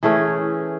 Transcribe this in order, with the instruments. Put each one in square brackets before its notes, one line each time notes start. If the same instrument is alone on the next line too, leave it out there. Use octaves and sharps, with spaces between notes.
[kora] E3 A3 C#4 G#4